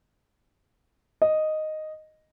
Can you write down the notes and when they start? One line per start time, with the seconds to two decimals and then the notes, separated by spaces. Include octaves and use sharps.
1.22 D#5